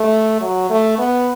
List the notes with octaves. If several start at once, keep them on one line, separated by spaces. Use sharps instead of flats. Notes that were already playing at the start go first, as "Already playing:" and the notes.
Already playing: A3
F#3
A3
B3